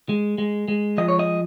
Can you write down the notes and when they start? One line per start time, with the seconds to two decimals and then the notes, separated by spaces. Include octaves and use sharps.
0.09 G#3
0.38 G#3
0.68 G#3
0.98 F3 D#5
1.08 C#5
1.19 D#5